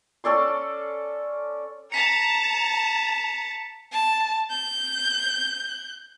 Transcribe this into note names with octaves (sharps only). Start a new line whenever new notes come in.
C#4 A4 D5 C6
A5 A#5 B6 C#7
A5
G6